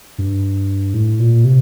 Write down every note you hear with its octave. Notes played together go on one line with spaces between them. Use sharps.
G2
A2
A#2
C3